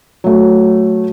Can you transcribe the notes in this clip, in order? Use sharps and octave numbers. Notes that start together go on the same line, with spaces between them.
F#3 A3